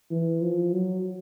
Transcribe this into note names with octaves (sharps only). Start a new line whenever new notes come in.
E3
F3
F#3